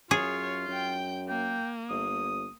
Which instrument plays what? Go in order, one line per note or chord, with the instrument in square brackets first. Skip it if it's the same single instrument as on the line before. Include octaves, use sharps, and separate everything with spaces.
[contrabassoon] F#2 [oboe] F4 [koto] G#4 [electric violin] C#5
[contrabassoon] F#2 [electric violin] G5 G6
[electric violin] A#3 [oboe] G5
[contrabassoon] G1 [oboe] D#6